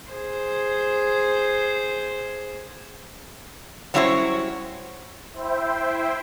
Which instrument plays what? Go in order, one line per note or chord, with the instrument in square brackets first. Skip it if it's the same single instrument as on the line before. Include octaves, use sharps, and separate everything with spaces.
[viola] G#4 C5
[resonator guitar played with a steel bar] F#3 G3 C#4 E4 C5 C#5
[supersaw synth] E4 C5 E5 G5